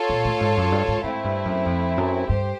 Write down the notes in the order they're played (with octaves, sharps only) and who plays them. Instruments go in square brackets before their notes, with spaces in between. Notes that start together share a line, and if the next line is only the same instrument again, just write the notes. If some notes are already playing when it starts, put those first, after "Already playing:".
Already playing: [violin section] F4 A4 C#5 F5 A5
[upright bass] A#2
A2
G#2
F#2
G2
G#2
[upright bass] G#2 [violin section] A3 C4 E4
[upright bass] G2
F#2
F2
F#2
[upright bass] G2 [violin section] G4 C5